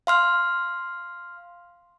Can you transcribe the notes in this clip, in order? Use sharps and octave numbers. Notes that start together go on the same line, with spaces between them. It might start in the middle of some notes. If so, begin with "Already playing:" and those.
F5 C6 F6